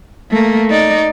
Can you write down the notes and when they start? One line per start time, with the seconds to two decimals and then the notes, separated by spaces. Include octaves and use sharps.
0.31 A3 A#3
0.70 D#4 D5